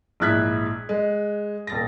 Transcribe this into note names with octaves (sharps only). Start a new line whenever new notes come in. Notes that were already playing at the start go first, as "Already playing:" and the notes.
A#1 G#2 E4 F#6 G#6 B6
G#3
D#1 A6 A#6